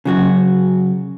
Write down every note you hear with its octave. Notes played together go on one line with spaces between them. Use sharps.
C#3 F#3 F#4